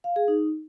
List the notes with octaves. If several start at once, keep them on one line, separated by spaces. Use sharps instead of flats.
F5
G#4
D#4